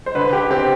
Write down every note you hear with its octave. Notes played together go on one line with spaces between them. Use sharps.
C5
D3 B4
G4
C4 G4